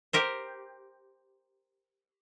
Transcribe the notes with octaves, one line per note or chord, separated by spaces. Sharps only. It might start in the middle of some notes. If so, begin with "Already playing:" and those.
G4 A#4 C5